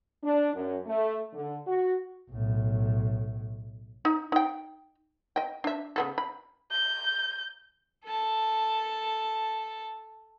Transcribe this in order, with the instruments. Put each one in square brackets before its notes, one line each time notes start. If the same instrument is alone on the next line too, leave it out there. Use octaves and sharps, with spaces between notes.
[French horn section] D4
F#2
A3
D3
F#4
[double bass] B1 A2
[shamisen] D#4
D#4 G5
D#5 G5
D4 E5
C#3 B3 A4
B5
[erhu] G6
[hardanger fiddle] A4 A5